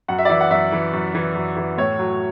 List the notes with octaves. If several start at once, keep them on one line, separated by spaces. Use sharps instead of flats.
F#2 F#5
E5
D5
E3 E5
F#5
F#2 E5
E3
F#2
E3
F#2
E3
A2 C#5
F#3